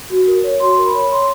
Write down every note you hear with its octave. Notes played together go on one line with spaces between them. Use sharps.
F#4
A#4
C#5
F#4 C6
A#4
B5
C#5
C#5 C6